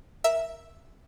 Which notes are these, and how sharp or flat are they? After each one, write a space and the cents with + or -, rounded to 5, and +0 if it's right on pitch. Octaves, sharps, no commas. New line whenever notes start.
A#4 +0 E5 +0